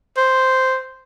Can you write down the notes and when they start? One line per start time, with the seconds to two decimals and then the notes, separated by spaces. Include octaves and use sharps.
0.17 C5